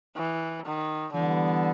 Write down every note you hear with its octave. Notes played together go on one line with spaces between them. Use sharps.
E3
D#3
D3 E3 G3 B3